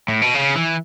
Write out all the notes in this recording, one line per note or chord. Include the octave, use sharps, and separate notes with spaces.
A2
B2
C#3
E3